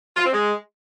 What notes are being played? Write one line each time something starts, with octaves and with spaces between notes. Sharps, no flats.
F4
C4
G#3